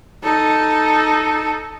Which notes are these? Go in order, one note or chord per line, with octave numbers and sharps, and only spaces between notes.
D#4 A4